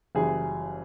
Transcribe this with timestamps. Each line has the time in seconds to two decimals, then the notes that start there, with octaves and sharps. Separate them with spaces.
0.15 F#1 F#2 C#3 E3 G3 G#4